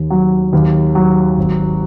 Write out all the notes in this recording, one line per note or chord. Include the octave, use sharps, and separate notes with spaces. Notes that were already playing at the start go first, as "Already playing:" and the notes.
Already playing: D#2
F#3
D#2
F#3
G#1